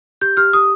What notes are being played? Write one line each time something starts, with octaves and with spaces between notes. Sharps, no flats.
G4 G6
G4 F6
G4 D#6